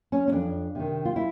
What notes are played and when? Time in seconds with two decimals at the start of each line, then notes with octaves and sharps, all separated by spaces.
0.12 C#4
0.28 C#4
0.32 F2 D4
0.75 C3 D#3
1.05 F4
1.16 E4